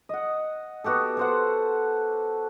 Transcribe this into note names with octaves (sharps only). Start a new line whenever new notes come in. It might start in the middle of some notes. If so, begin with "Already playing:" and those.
D#5 F#5
B3 F#4 G4 A4
A4 C5 F#5